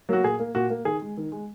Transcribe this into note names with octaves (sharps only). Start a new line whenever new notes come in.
F#3 A#3 F#4
A#2 G#4
A#3
A#2 F#4
A#3
D#3 G#4
G#3
D#3
G#3